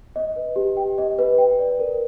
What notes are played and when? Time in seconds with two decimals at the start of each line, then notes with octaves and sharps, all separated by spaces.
0.16 D#5
0.36 B4
0.56 G4
0.77 G5
0.98 D#5
1.19 B4
1.38 G5
1.59 D5
1.79 A#4